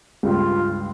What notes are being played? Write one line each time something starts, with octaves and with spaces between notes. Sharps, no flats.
C#2 G2 F4